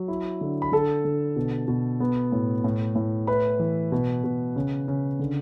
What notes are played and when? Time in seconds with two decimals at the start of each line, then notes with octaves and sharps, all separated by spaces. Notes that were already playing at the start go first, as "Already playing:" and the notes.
Already playing: F#3
0.08 E4
0.41 D3
0.62 B5
0.72 D3 A4 A5
1.05 D3
1.36 B2
1.68 B2
2.00 B3
2.32 A2
2.64 A2
2.96 A2
3.27 E4 B4 B5
3.59 E3
3.92 B2
4.24 B2
4.56 C#3
4.88 C#3
5.19 D3